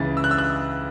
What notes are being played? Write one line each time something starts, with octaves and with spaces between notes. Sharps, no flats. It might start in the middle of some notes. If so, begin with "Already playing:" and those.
Already playing: C#2 C#3 E3 A6
E6
F#6
E6
F#6